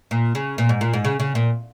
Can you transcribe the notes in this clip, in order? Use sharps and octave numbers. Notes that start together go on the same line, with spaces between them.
A#2
C#3
A#2
G#2
A#2
G#2
C#3
C#3
A#2